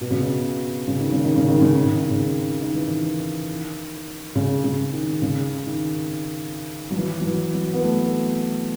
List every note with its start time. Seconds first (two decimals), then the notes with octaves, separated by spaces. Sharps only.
0.01 B2
0.11 C#3
0.21 B2
0.87 C#3
1.00 D#3
1.12 C#3
1.24 D#3
1.36 C#3
1.48 D#3
1.61 C#3
1.74 D#3
1.85 C#3
1.98 D#3
2.11 C#3
2.61 D#3
2.75 E3
2.87 D#3
4.35 C#3
4.64 C#3
4.93 D#3
5.22 C#3
5.66 D#3
6.91 F#3
6.97 E3
7.20 F#3
7.25 E3
7.54 F#3
7.73 B3
7.83 A3